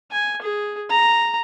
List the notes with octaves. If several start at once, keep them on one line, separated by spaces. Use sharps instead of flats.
G#5
G#4
A#5